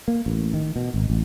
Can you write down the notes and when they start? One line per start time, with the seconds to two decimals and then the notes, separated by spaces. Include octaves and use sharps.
0.08 A#3
0.26 A1
0.54 D#3
0.76 B2
0.94 G#1
1.10 A1